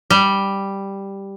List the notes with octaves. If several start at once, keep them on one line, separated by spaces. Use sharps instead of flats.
G3